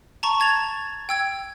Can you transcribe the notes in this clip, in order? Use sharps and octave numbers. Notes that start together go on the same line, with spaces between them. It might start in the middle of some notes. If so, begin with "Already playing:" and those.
A5 A#5 C#6
A5 G#6 A6 F7
G5 E6 G#6